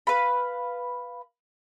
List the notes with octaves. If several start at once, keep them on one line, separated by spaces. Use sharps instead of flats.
B4 F5 B5